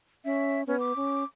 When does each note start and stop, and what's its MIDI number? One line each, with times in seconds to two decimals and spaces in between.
0.25 0.63 61
0.25 0.61 76
0.67 0.95 59
0.67 0.78 61
0.80 1.25 86
0.96 1.24 61